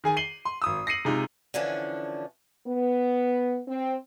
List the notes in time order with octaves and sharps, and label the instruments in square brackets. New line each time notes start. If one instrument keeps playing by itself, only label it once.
[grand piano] D#3 G#4 G#5
C7 D#7 F#7 G7
C6
G#1 D#6 E6
A#6 C7 C#7 D#7 F#7
C3 G#3 D#4 F4
[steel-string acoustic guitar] D3 E3 F3 C#4 D4
[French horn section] B3
C4